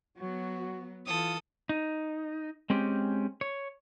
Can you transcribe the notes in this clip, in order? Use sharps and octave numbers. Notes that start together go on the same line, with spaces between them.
F#3 B3 F#4
E3 F4 A4 D#6
D#4
G#3 C4 C#4 G4
C#5